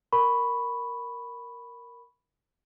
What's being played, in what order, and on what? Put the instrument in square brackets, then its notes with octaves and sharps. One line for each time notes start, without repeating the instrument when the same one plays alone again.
[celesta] A#4 B5 C#6